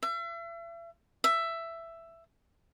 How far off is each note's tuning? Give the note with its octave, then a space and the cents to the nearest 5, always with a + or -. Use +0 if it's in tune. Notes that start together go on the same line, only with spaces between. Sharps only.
E5 +40
E5 +10